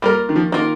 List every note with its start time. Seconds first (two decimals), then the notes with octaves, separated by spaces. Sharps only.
0.02 G3 A#3 F4 A#4
0.29 D#3
0.36 F3
0.52 D#3 A#3 F4 A#4